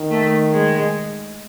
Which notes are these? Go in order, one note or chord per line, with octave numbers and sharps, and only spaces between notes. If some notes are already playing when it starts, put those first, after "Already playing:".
Already playing: D#3
A3
G#3